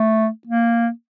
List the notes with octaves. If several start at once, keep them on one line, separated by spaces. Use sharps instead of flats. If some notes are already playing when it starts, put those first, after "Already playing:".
Already playing: A3
A#3